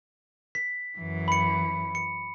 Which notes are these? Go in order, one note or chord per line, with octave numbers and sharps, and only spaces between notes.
B6
F#2 E3
B5 C#7
C#7